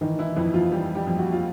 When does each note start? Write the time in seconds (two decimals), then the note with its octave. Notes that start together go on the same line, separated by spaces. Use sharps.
0.01 D#3 E3 D#4
0.19 E3 E4
0.36 F2 E3 E4
0.54 F3 F4
0.71 E3 G3 G4
0.95 G3 G4
1.07 F2
1.19 F#4
1.32 F4